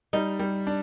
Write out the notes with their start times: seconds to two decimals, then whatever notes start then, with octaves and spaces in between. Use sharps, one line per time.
0.13 G3 D#4
0.39 G3
0.67 D4